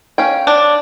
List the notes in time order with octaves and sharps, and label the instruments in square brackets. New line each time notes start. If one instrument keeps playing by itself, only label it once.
[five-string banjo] C#4 F5 G5
[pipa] D4